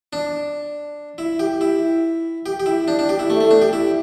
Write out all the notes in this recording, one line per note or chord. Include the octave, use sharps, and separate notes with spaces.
D4
E4
G4
E4
G4
G4
E4
D4
D4
G4
E4
A3
A3
D4
G4
E4